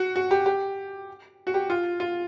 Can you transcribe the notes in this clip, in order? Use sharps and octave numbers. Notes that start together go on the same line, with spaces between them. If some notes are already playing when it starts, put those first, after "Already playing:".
Already playing: F#4
F#4
G4
G4
F#4
G4
F4
F4